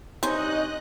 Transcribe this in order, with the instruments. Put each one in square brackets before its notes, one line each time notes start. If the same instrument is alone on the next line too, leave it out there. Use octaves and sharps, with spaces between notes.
[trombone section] G2 D#4 [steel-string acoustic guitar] C3 C#4 [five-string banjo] C5 [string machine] D#5 F#6